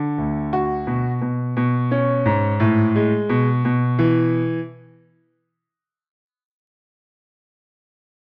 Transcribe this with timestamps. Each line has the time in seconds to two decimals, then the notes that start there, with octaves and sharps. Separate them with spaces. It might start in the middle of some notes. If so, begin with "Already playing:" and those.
Already playing: D3
0.18 D2
0.53 F#4
0.87 B2
1.22 B2
1.57 B2
1.91 C#4
2.26 G#2
2.60 A2
2.96 G#3
3.29 B2
3.65 B2
3.99 E3